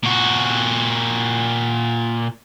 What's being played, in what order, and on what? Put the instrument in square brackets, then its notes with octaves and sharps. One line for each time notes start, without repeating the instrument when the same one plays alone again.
[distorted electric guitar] A#2 F#4